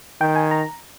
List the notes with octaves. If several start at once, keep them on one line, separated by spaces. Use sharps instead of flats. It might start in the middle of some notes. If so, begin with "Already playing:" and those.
D#3 G5
G#5
A#5